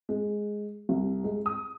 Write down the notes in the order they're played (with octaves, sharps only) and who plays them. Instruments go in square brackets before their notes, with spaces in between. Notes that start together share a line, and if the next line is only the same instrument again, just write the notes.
[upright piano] G#3
C2
G#3
D#6